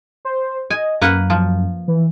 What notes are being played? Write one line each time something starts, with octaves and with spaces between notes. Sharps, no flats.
C5
D#5 G#5
F#2 A#3 B4 F#5
F3
E3